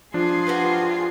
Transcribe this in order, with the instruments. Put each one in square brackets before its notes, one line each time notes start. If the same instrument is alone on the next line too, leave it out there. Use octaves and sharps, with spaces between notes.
[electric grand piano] F3 D4 [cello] F4 G#4
[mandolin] F#4 G4 B4